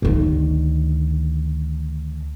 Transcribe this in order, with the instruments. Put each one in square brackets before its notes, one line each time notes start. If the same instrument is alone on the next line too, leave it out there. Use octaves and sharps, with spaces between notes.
[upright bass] D2 D#3